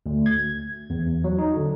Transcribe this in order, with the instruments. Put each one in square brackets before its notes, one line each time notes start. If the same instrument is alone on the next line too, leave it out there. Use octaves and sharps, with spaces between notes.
[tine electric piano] D2
G#6
E2
F#3
D#4
D3